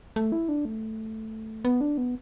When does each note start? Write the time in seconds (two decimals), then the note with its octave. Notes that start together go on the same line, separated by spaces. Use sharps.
0.16 A3
0.32 E4
0.49 D4
0.65 A3
1.65 B3
1.81 D4
1.98 B3